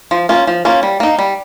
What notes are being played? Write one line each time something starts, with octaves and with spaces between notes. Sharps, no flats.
F3
A#3 C#4 F4
F3
A#3 C#4 F4
G3
A#3 D#4
G3